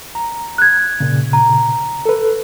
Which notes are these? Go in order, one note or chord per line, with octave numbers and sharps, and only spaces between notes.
A#5
F#6 G#6
A#2 C#3
A#5
A4 B4